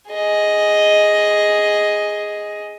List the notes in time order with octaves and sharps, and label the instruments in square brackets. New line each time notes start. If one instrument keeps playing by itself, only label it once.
[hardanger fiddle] G#4 D#5